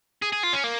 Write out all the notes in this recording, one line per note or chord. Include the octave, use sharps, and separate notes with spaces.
G#4
G#4
F4
C#4
A#3